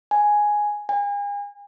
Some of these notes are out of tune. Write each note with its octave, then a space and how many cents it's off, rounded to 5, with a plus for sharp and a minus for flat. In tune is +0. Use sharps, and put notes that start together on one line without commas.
G#5 +0
G#5 -40